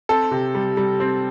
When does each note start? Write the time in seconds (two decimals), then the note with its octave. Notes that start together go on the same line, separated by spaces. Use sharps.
0.09 C4 A4
0.31 C3
0.55 G3
0.77 G3
1.00 C4